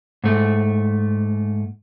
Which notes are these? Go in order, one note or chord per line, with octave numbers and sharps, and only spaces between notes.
G#2 A3